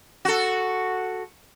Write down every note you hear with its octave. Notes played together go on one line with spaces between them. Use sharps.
F#4 A4